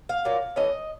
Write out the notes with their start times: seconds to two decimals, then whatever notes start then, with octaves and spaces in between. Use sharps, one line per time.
0.09 F5
0.25 A#2 F#3 A#3
0.56 E3 A3 C#4 D#5